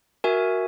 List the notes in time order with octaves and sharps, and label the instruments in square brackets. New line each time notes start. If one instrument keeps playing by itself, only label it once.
[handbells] F#4 A#4 E5 G#5